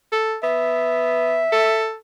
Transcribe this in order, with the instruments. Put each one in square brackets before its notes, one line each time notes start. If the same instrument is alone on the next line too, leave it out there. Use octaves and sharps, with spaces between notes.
[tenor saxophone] A4
[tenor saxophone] B3 [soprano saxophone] E5
[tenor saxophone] A4